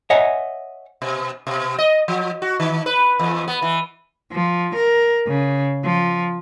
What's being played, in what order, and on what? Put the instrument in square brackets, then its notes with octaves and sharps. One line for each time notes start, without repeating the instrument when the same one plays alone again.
[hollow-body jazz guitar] C#5 D#5 E5 F#5 G#5
[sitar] B2
B2
D#5
F3
F#4
D#3
B4
E2
B3
E3
[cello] F3
A#4
C#3
F3